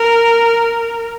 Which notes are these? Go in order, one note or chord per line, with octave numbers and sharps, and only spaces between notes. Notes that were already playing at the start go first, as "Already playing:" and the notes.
Already playing: A#4